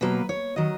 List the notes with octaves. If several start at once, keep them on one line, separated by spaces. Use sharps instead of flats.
B2 F#3 A#3 B4
C#5
D#3 F#3 D#5